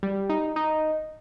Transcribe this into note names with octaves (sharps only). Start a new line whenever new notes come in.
G3
D#4
D#4